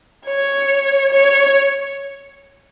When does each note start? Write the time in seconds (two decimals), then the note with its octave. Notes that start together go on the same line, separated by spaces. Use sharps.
0.27 C#5
1.12 C#5